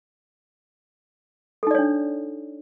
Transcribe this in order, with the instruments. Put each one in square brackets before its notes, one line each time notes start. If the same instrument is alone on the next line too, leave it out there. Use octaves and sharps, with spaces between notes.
[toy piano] A4
D#4
D5
C#5
D4